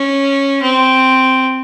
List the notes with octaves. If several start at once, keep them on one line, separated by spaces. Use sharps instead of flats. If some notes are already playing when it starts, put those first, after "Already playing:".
Already playing: C#4
C4